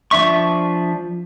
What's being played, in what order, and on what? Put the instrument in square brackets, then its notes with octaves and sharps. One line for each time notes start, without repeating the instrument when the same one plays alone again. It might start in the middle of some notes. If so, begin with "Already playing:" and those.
[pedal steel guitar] F3 D4 E5 C#6